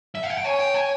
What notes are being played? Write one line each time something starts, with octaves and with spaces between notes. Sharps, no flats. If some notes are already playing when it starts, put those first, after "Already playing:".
E5
F5
F#5
G5
C#5 G#5
G5
G#5